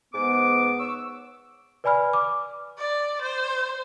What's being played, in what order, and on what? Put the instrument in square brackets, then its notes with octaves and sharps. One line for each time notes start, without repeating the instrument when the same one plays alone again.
[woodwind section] G#2 D6 [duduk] B3
[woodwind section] C#6 E6
[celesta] B4 D5 G#5 B5 F6
D6
[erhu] D5
C5